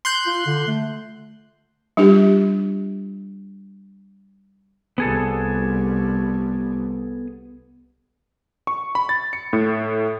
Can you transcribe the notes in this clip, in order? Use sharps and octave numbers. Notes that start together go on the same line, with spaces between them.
C6 F#6 G6
F4
D3
A3
G3 D4 F4 G4
C2 G3 B3 G#4 A4
C#6
B5
A6
C#7
A2